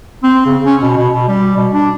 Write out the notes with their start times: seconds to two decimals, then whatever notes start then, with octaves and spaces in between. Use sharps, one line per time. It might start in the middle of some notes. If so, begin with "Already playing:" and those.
0.23 C4
0.46 C#3
0.65 C#4
0.82 B2
0.97 B2
1.13 B2
1.28 G3
1.57 B2
1.73 D4